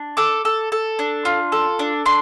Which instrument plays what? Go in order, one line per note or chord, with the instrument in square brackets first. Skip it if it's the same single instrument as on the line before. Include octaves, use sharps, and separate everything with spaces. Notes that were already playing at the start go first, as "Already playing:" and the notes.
Already playing: [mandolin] D4
A4 D6
A4
A4
D4
F4
A4
D4
D4 C6